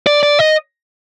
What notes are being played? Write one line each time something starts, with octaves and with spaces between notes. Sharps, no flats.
D5
D5
D#5